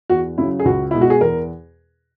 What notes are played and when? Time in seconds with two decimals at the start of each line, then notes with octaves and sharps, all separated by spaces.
0.10 E2 F#4
0.38 C#3 F#3 E4
0.59 G#4
0.65 C#2 F#4
0.91 B2 G#3 E4
1.01 F#4
1.10 G#4
1.21 E2 A#4